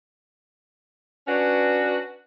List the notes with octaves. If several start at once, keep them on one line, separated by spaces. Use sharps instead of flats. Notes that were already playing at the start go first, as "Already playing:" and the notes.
C#4 D4 F#4 B4